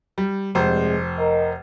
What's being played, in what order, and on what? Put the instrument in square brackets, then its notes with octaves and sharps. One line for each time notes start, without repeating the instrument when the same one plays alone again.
[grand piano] G3
[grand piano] F1 C5 [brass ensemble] G2 C3 G#3
[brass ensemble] A#4 D#5